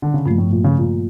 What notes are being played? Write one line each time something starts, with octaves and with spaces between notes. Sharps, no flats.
D3
C#3
G2 A#2 F3 A3
A2
A#2
C#3
A#2